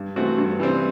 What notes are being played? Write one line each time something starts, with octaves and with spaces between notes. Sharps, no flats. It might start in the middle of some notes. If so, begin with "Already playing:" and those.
Already playing: G2
E3 A3 C4 F#4
G2
E3 G3 C4